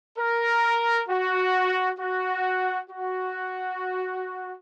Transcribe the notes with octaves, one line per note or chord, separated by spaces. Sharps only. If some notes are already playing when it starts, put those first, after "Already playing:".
A#4
F#4
F#4
F#4